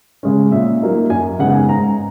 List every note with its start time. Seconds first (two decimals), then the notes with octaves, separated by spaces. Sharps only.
0.23 C#3 G#3 C#4
0.52 A#2 E5
0.82 F#3 A#3 D#4
1.10 F#2 G#5
1.39 C#3 G#3 B3 D#4 F#5
1.50 F#5
1.54 G#5
1.69 G#2 A#5